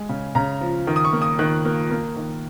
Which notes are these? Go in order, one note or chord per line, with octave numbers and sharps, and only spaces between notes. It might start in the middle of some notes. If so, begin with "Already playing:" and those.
Already playing: G#3 G#5
C#3
C#3 A#5
F3
D#3
D#6
C#6
A#3
D#6
D#3 F#6
A#3
A#3
D#3